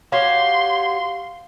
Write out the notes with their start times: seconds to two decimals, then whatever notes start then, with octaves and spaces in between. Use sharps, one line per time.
0.12 F#4 G4 C#5 F5 C6